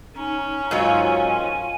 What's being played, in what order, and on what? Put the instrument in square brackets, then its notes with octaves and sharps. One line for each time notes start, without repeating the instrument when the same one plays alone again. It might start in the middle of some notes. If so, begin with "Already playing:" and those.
[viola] C#4 [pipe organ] D#4
[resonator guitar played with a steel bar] G#2 F#3 C#5 [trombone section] D#3 F4 [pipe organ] G#5